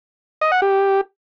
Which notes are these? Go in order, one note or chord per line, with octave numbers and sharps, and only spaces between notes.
D#5
F#5
G4